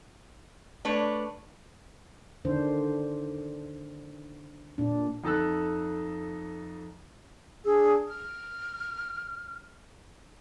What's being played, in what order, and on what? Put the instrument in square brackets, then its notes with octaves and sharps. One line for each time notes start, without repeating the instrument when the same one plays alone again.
[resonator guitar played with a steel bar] A3 D4 B4 C#5
[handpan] D3 D#3 D4 C5
A#2 D4
[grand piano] F2 D#4 A4 A5 E6 F#6
[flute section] D4 G#4 E6
F6